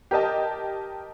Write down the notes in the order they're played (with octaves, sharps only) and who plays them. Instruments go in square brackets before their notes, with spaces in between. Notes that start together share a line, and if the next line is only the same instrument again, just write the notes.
[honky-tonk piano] G4 A#4 D#5 A5